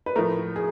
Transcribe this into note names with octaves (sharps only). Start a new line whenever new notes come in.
B4
A2 F3 A3 A#4
G#4